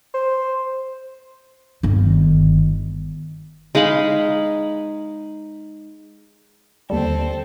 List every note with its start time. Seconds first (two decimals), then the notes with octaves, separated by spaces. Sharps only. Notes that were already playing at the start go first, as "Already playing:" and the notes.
0.15 C5
1.83 G1 D#3
3.75 G#3 D#4 F5 B5
6.90 D#2 D3 G3 C4 A4